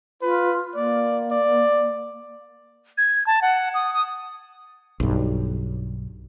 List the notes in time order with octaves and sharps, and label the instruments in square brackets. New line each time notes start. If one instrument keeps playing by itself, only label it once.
[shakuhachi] F4 [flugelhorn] B4
[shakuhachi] A#3 [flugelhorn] D5
[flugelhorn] D5
[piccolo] G#6
A5
F#5
D#6
D#6
[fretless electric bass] B1 G2